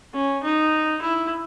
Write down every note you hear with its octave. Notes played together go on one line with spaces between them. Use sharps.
C#4
D#4
E4